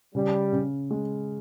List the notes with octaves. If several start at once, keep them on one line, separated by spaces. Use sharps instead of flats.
C#3 G3
C#3
G#3